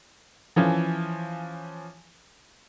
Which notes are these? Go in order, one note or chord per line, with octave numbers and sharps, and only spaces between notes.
E3 F3 C#4